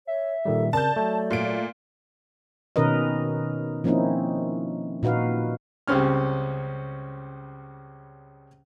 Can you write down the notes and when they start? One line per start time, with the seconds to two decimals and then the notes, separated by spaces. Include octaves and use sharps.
0.07 C#5 E5
0.45 A#2 D#3 G3 A4
0.73 C#3 C4 A#4 D5 A5 G6
0.96 F#3 A3
1.31 A#2 D7
2.76 B2 D#3 C#4 A#4 B4 D#5
3.84 F3 A#3 C4 C#4 D#4 E4
5.03 A#2 D#4 F#4 B4 F5
5.88 C#2 C#3 G3 C4 C#4 F6